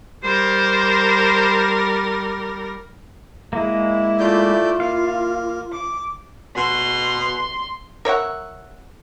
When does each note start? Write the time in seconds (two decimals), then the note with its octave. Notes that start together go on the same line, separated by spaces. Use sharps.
0.24 G3 A#4 C5
3.53 G#3 A#3 E4
4.20 A3 F4 D5 G6
4.80 A#3 F5
5.71 D6
6.57 B2 C6
8.05 A#4 C#5 E5 F#5